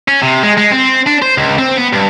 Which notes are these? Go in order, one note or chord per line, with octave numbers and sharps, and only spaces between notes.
C#4
C3
G#3
G#3
C4
D4
C5
C#2
C4
B3
G2